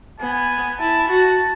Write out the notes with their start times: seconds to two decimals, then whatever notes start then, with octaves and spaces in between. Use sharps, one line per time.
0.20 B3 G#5
0.79 E4 A5
1.08 F#4 A5